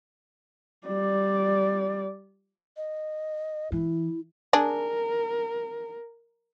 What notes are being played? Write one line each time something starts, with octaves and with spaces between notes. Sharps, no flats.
G3 D5
D#5
E3 E4
D4 G#4 A#4